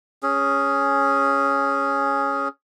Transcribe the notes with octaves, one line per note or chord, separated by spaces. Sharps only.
C#4 G#4